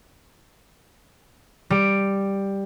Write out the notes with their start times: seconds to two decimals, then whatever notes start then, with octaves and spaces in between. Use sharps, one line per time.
1.70 G3 D7